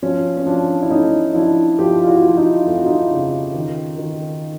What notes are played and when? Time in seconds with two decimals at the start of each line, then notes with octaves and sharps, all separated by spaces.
0.02 F3 C#4
0.37 C#4
0.46 F3 D4
0.82 E4
0.90 A3 C#4 D#4
1.34 F3 D4 E4
1.79 F3 F4 G4
2.03 F4
2.07 E4 F#4
2.23 F3
2.29 F#4
2.37 D#4 F4
2.66 F2 F4
2.77 F#4
2.86 D#4 F4
3.11 C#3
3.54 D#3
3.98 D#3